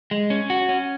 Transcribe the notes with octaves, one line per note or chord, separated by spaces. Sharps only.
G#3
C#4
F#4
C#4